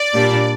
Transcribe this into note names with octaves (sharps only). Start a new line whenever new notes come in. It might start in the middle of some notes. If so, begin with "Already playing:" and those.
Already playing: D5
A#2 G3 D4